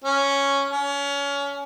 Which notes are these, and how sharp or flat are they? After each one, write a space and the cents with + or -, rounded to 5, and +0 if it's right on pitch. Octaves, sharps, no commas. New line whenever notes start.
C#4 +0
C#4 +25